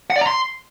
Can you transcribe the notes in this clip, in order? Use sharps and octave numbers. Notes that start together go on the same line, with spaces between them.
F#5
D5
A#5
C6